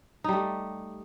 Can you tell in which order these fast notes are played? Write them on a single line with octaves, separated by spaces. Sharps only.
D#4 G3 A3